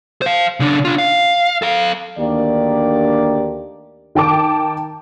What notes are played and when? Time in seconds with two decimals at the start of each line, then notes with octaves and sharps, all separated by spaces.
0.22 C5 F5
0.60 C#3 D4
0.85 D4 F4
0.98 F5
1.62 A4 F5
2.19 D2 D#3 A#3 D4 G4 D5
4.15 D#3 G5 A5 D6